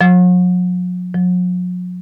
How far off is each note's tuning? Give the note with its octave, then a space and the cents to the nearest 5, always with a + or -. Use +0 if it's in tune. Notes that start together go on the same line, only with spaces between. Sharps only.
F#3 -45
F#3 -45